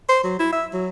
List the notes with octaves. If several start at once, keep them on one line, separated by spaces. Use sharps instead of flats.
C5
F#3
E4
E5
F#3